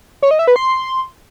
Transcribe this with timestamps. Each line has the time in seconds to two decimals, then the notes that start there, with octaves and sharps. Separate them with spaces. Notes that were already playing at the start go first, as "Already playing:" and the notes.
0.22 C#5
0.31 D#5
0.39 E5
0.47 B4
0.56 C6